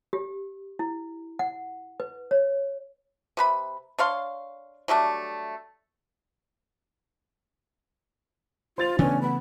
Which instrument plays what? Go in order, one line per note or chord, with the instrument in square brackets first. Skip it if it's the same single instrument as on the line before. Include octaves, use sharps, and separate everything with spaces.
[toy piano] G4
E4
F#5
B4
C#5
[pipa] C3 B4 B5
D4 C#5 F5 C6
F#3 G3 A3 D4
[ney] F4 [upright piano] C5 A6 F7
[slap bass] C#3 E3 A3 [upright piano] B3 D4 [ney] C#4
[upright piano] B3 F#5 [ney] B5